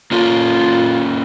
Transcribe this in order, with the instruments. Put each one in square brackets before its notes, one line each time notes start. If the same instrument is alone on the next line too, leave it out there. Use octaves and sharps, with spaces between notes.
[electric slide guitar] A#3 C#4 A4 [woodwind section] F4